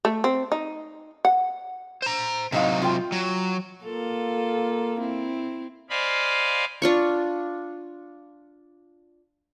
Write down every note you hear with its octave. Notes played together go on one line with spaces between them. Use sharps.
A3
C4
D#4
F#5
C5 A#5
A2 C3 F#3 D#4 F5
F4 G5
F#3
A#3 F4 A4
C4 E4
C5 D5 D#5 F5 G#5 B5
D4 F4 C#6